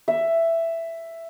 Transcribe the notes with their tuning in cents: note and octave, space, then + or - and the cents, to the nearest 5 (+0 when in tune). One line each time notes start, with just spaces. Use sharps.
E5 +10